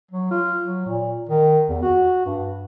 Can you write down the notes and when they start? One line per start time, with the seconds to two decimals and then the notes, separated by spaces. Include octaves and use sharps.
0.11 F#3
0.31 F4
0.64 F#3
0.86 A#2
1.29 D#3
1.69 E2
1.83 F#4
2.25 G2